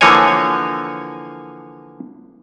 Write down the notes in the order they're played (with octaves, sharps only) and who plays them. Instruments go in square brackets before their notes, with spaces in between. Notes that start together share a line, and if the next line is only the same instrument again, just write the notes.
[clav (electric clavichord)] D3 E3 F3 A#3 C#5 G#5